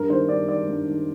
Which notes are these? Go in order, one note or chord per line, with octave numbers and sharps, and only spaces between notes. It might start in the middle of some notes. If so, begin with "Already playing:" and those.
Already playing: G2 A#4
D#3 C5
G2 D5
D#3 D5
G2
D#3